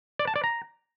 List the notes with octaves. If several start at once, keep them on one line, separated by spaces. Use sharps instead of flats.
D5
A5
D5
A#5